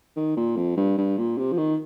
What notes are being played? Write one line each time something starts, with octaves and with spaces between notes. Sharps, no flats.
D#3
A#2
F2
G2
G2
A#2
C3
F3
D#3